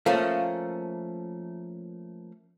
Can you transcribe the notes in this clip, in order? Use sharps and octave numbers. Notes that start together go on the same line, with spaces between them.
F3 A3 A#3 C#4